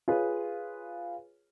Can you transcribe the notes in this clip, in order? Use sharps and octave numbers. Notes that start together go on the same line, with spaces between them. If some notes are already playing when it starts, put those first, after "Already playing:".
F4 G#4 B4 C#5